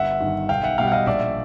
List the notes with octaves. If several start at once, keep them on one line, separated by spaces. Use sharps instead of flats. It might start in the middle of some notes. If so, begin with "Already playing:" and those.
Already playing: G1 E5 F#5
G2 D#3
B1 F5 G5
E5 F#5
B2 G3 F5 G5
F#5
D#5 F5
A#1 D5 E5